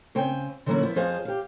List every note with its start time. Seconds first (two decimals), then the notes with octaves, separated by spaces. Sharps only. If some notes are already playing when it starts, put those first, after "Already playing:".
0.15 C#3 C4 G5 G#5
0.66 D3 E3 F#3 A#3 C#4 E4
0.82 F3 B3 E5
0.96 F2 F3 G#4 C5 F5
1.25 G4 F5